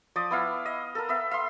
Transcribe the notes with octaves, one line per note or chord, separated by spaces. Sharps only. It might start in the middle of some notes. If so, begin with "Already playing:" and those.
F3 D5 D#6
B3 E4 F5
D#5
A4 A#4
B3 E5
E5 C6